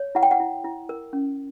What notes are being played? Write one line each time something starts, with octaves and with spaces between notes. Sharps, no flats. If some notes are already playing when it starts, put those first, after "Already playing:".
Already playing: C#5
E4 F#5
G5
F#5
E4
E4
A#4
C#4